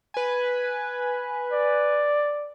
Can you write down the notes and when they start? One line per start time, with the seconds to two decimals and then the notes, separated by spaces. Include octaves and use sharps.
0.14 B4 G#5
1.52 D5